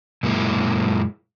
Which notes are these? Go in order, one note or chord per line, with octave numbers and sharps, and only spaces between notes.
F#2 A#2 G#3 A#3 E4